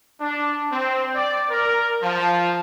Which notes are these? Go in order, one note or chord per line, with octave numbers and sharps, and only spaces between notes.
D4
C4
D5
A#4
F3